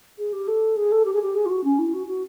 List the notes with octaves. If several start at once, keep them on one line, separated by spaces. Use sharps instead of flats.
G#4
G4
A4
G#4
A4
G4
G#4
G4
G#4
F4
F#4
C#4
E4
F#4
F#4